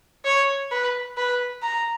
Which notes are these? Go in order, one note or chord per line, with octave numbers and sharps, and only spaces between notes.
C#5
B4
B4
A#5